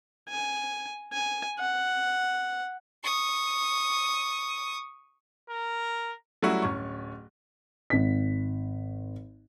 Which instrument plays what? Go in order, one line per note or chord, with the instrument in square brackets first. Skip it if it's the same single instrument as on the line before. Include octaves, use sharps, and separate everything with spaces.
[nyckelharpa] G#5
G#5
F#5
[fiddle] C#6 D#6
[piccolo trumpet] A#4
[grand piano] F#3 G3 A3 C#4 E4 F#4
D1 C#4 C#6
[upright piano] G#1 B6